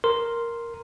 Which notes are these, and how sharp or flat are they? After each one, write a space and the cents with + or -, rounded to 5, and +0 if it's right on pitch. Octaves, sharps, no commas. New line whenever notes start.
A#4 +0 C6 +0